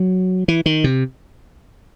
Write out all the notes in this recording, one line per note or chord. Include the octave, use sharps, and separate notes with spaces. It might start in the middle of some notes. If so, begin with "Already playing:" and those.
Already playing: F#3
E3
D#3
C3